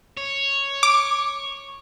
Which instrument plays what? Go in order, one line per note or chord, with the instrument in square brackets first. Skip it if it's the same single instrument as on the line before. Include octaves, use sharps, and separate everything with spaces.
[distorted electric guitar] C#5
[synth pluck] D6